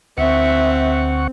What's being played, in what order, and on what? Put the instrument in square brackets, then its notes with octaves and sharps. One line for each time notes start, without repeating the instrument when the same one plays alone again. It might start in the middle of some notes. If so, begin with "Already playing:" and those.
[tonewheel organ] D2 F#5 C#6 [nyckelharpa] C4 [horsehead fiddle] E5